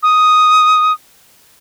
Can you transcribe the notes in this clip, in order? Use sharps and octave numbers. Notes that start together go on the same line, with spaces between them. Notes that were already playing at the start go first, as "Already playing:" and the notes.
D#6